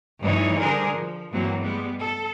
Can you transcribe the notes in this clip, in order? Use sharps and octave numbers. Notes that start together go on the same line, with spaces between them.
G2 E3 F3 A3 D#4 C#5
D3 G3 D4 G#4 A#4 C5
F3
G2 E3 F#3 A#3 C4
G3 G#3 B3
A4